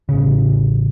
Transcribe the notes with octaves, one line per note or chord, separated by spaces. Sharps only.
A1 C#3